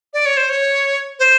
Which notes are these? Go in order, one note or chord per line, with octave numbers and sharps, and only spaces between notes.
D5
C#5
C5
C#5
C5